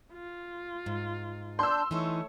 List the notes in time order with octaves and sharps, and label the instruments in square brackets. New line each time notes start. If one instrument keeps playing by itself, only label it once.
[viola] F4
[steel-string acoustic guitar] G#2
[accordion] D4 G6 [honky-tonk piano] C6 E6
[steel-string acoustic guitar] E3 D#4 [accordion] A3 [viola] C#5 C#6